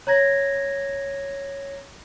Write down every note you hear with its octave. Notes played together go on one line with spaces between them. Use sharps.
C#5 A#5 G#6 A#6